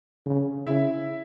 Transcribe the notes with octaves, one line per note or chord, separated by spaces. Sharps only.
C#3
C#3 E4 E5